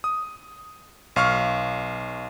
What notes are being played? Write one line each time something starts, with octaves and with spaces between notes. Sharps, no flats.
D#6
B1 F5 C#6 F6